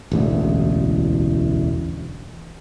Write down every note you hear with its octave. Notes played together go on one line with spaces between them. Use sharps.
E1 A1 D2